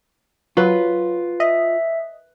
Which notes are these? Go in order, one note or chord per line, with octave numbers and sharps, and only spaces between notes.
F#3 F4 B4
D#5 E5